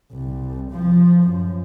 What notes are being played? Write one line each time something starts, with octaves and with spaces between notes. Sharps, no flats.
C2
F3
F#2